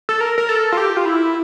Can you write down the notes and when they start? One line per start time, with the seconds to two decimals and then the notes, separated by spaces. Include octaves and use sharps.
0.09 A4
0.21 A#4
0.38 A#4
0.49 A4
0.72 F4
0.77 G4
0.97 F4
1.05 E4